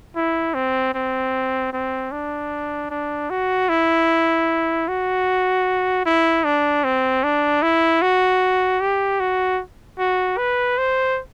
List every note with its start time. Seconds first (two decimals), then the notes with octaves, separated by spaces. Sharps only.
0.16 E4
0.54 C4
0.94 C4
1.73 C4
2.12 D4
2.90 D4
3.30 F#4
3.69 E4
4.88 F#4
6.06 E4
6.44 D4
6.84 C4
7.24 D4
7.63 E4
8.02 F#4
8.81 G4
9.20 F#4
9.99 F#4
10.38 B4
10.78 C5